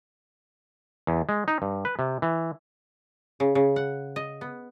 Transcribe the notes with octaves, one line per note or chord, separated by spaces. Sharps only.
E2
G#3
D#4
G2
B4
C3
E3
C#3
C#3
F#5
D#5
B3